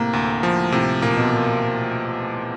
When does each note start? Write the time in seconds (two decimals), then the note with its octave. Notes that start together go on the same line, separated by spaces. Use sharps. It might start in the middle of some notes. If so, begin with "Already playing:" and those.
Already playing: A2 C3 A#3
0.13 D2
0.43 F3
0.72 A2 C3
1.02 A#2 A#3
1.17 B2